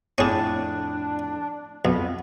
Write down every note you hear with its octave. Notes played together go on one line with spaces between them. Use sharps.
F2 A2 C#4 D4 G#4 A5
B1 F2 B3